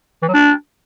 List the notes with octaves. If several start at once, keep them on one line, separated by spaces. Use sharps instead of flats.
E3
F#3
D4